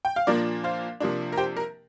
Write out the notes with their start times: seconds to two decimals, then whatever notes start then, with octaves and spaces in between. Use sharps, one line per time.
0.05 G5
0.16 F5
0.27 A#2 F3 A#3 D4 A#4 D5
0.64 C5 F5
1.00 C3 F3 A#3 D4
1.32 A#4
1.37 G4 C5
1.57 A#4